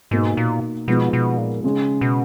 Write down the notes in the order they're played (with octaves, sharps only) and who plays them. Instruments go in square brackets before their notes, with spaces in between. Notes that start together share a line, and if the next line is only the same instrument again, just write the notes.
[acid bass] G#2 [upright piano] B2 A#3 D#4
[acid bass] A#2
[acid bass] B2 [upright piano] F3 G#3 B3 D#4
[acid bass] B2
A#2
[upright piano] C#3 G#3 C#4
[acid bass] B2